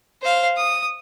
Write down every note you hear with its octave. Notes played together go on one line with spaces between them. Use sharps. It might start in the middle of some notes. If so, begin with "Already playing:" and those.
C5 F5
D#6